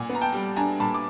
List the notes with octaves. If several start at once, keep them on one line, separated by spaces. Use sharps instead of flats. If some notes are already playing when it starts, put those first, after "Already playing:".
Already playing: A#2 F#5 G#5
B3
A#5
G5 A5
G3
D4 G#5 A#5
A#2 A5 B5
D6